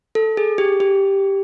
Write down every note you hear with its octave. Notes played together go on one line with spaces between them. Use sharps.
A4
G#4
G4
G4